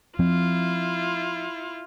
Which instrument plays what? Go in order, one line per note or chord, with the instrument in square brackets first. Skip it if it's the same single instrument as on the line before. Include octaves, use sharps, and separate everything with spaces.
[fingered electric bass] F3 C4 [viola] E4 F4